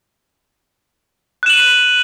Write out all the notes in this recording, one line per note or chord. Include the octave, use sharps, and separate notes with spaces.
F#6 D#7 E7 F#7